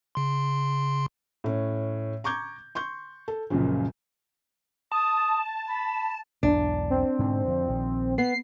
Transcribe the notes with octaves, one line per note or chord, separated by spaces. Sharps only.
C#3 C6
A2 C#4
A#5 C#6 D6 G6 G#6
C6 C#6 G6
A4
C#2 F#2 A#2 C#3 F3
A5 D#6
B5
B1 E2 G#2 D4
C4
G#2 B2 D3
F2 D3
A#1 D#3 F3
B3 C7